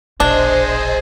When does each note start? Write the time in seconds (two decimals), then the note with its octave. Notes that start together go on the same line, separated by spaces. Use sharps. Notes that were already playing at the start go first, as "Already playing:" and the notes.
0.20 E1 A#1 D4 G#4 C5 D#5 E5